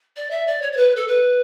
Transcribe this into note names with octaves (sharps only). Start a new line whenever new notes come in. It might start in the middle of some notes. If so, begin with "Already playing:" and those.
D5
E5
D5
C#5
C#5
B4
A4
B4